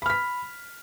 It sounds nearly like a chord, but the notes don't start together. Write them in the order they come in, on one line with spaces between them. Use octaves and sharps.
B5 F6 B6